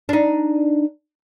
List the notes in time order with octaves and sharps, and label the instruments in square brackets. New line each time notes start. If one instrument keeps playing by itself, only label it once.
[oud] D4 D#4